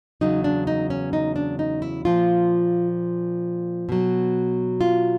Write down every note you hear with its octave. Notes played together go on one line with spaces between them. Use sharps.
E2 C#3 F#3 D#4
D4
D#4
C#4
D#4
D4
D#4
E4
A#2 F3 F4
B2 F#3
F4